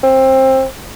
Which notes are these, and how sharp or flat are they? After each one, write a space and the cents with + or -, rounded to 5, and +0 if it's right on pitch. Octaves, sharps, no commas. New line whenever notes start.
C4 +20